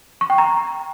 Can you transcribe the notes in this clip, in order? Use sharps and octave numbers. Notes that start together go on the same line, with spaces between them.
C#6
G5
A#5